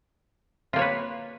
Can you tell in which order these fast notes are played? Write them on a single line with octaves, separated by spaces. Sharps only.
F4 A#3 C#5 B4